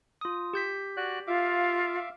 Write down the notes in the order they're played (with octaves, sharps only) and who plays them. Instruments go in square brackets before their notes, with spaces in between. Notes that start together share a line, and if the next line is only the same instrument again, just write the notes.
[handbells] F4 D#6
G4 G6 B6
[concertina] F#4 D5 F#6
[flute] F4 [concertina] E5 F5 D6